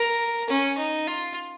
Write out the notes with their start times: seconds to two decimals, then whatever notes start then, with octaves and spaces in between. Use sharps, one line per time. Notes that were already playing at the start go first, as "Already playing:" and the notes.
Already playing: A#4
0.49 C#4
0.78 D#4
1.08 F4